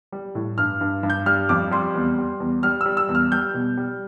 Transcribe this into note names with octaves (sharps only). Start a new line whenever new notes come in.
G3
A2
G2 F6
G2
G2
G6
G3 F6
F2 D6
G3 C6
E2
G3
E2
G3 F6
G3 E6
E6
E2
F6
G3 G6
B2
G3